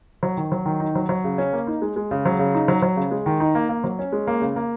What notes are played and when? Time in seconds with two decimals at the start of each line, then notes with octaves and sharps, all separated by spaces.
0.23 F#3
0.37 D#3
0.52 F#3
0.66 D#3
0.80 D#4
0.95 F#3
1.09 F#3
1.24 C#3
1.38 C#4
1.53 A#3
1.67 D#4
1.82 G#3
1.96 G#3
2.11 C#3
2.26 F#3
2.39 C#3
2.54 D#4
2.68 F#3
2.82 F#3
2.97 C#3
3.11 G#3
3.26 D#3
3.40 D#4
3.55 A#3
3.69 A#3
3.84 F#3
3.99 C#4
4.12 G#3
4.27 A#3
4.41 C#3
4.56 A#3